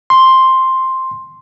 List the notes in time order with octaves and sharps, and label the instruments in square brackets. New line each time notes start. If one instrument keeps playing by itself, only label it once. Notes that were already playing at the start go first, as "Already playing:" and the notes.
[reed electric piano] C6